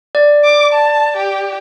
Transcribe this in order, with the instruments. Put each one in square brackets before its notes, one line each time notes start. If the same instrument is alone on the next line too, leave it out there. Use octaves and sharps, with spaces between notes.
[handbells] D5
[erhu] D6
A5
G4